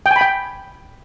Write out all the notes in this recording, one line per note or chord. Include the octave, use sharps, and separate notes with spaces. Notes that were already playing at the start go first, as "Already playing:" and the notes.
G5
G#5
B5
G5